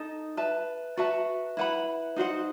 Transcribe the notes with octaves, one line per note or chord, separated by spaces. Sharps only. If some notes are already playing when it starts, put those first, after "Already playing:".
Already playing: D#4 A4 D#5
B4 E5 A5
F#4 B4 E5 A5
E4 B4 F#5 B5
D#4 F#4 C5 F#5